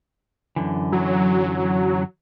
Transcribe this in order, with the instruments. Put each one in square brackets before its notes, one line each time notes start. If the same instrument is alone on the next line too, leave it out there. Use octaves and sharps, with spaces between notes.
[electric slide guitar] F#2 D3 E3
[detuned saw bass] F#3